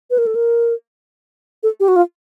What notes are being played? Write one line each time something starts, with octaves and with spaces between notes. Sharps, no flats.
B4
A#4
A4
A#4
A4
G4
F#4
F4